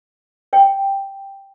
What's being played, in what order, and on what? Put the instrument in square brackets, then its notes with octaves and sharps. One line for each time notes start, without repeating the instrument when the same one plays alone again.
[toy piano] C#5 G5